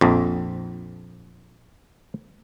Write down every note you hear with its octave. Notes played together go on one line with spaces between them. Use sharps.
A#1 F2